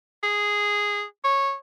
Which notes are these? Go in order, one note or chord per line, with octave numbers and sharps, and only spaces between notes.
G#4
C#5